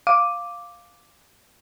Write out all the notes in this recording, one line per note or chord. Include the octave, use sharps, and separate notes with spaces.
F5 D6 D#7